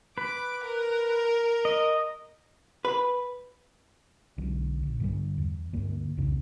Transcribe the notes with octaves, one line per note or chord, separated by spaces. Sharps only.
B4 D6
A#4
D#5
B4
B1 D3
A#1
G2 D3 G3
E2
D2 G2 A#3
C2 F2 C#3